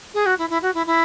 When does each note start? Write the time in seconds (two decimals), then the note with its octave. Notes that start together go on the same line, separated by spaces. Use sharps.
0.14 G#4
0.26 F#4
0.38 E4
0.50 E4
0.62 F#4
0.74 E4
0.87 E4